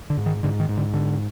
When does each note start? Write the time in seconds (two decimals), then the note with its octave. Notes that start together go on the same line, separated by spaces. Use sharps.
0.10 D3
0.17 G#2
0.26 D#3
0.43 G#2 D3
0.60 D#3
0.69 G#2
0.77 D3
0.94 D3